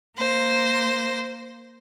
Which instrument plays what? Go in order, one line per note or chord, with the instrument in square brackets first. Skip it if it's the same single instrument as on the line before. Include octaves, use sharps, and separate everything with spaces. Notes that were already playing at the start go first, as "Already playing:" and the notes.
[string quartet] A#3 C5 A#6